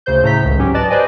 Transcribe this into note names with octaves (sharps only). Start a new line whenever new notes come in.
D2 C#3 C5 G6
A2 C#3 A#5 G6 B6
G#1 C#2
G#2 F#3 C#4 G4
B4 D5 D#5 A5 A6
B4 C5 D5 D#5 G#5